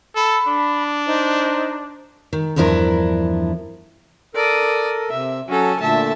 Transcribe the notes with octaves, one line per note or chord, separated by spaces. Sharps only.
A4 B5
D4
D#4 C5
D#3
E2 G2 F3 D4 E4 A#4
A4 A#4 D5 D#6
C3 E5
F#3 C#4 F#4 A4
A#2 D3 A3 E5 A5